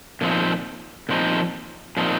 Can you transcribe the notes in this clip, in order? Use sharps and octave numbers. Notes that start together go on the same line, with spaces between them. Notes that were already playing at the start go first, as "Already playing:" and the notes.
A#2 F3 C4 D#4
A#2 F3 C4 D#4
A#2 F3 C4 D#4